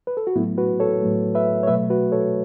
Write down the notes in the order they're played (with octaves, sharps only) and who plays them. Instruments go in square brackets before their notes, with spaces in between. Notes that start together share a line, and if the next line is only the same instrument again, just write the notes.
[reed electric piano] B4
A4
F#4
A2 F#3 A3 B3 E4
F#4 B4
A4 C#5
A2 F#3 A3
B4 E5
C#5
B2 F#3 A3 B4 E5
F#4 B4
A4 C#5